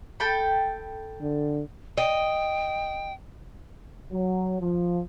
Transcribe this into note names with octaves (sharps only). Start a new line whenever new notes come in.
A4 G5 B5
D3
D#5 G5
F#3
F3